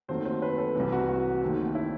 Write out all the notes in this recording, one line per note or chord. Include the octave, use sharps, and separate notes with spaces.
D#2 D#3 F#3 A3 C4 C5
C5
B4
A4
C2 C3 E3
F#4
F#4
D#2 D#3 A3 C4
E4